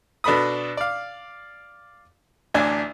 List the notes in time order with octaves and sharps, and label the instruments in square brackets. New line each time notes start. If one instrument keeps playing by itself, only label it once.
[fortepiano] B2 D4 A4 B4 B5 D#6
D5 F5
A1 D2 D4 G#5